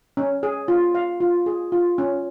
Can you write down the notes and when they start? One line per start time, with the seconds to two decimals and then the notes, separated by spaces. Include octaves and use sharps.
0.17 C#4
0.43 G#4
0.68 F4
0.95 F5
1.21 F4
1.46 G#4
1.72 F4
1.98 C#4